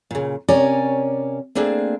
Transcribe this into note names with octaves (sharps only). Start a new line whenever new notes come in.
A#2 C#3
C3 C#4 A#4 C#5 D5 G#5
A3 A#3 C4 D4 G#4